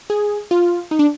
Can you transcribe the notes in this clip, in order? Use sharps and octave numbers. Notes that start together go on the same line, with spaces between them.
G#4
F4
D#4
D4